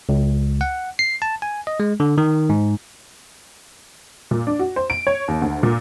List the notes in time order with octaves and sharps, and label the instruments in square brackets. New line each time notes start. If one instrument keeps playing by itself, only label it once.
[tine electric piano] C#2
F#5
C7
A5
G#5
D#5
G#3
D3
D#3
G#2
[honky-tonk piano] A#2
D4
F#4
C5
D7
C#5
D#2
D2
A#2